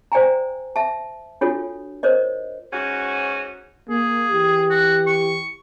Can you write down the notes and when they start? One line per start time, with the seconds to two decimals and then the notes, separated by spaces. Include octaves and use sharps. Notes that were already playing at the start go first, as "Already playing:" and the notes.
0.12 C5 D5 G5 G#5 A#5
0.76 E5 A5
1.41 D4 F4 F#4 A4 C#5
2.03 A#4 C5 C#5 D#5
2.73 G#2 C#4 F#4
3.89 A#3 G#4
4.31 E3 G4
4.70 F#4
5.07 C#6